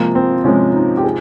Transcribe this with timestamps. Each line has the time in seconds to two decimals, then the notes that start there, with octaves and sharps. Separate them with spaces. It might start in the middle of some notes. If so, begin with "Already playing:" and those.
Already playing: C3 F3 G#3 A#3
0.15 C4
0.44 C3 F3 G#3 C#4
0.74 D#4
0.97 G4
1.04 G#4